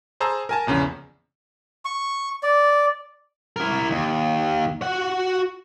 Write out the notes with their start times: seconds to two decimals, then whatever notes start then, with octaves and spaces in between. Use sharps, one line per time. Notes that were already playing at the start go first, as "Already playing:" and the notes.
0.20 G#4 C5 A5 A#5 E6
0.49 A#4 G#5 A5
0.67 A#1 E2 C#3
1.85 C#6
2.43 D5
3.56 E4 A#4
3.90 D#2
4.82 F#4 F#5